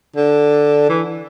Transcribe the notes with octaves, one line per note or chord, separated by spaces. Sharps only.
D3
E3